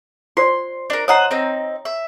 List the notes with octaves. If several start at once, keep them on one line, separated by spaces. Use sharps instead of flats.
F4 C5 D5 C6
D4 A#4
C5 C#5 D#5 F#5 A#5 D#6
C4 D#4
E5